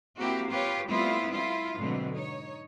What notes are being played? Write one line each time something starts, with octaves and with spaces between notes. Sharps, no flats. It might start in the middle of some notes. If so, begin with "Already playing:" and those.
A#3 C4 E4 F#4 G4
F4 G4 B4 C#5
G3 A3 B3 C4 E4 F4
E4 F4
G#2 B2 D3 F#3 A3 C4
D#4 C#5